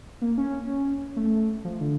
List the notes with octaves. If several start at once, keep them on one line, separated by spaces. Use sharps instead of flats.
A#3
C#4
A3
F3
D3